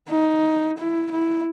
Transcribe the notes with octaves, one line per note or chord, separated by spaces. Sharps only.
D#4
E4
E4